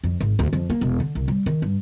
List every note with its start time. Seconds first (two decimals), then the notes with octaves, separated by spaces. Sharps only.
0.04 F2
0.21 G#1
0.39 D2
0.53 F2
0.70 A#3
0.81 E1
1.00 D3
1.15 C2
1.28 G3
1.46 D#3
1.62 G2